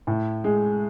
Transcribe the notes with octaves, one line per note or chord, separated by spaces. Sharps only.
A2
G#3